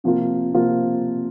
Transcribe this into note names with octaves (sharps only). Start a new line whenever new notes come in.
C3 F3 A#3 F4
C3 F3 A#3 F4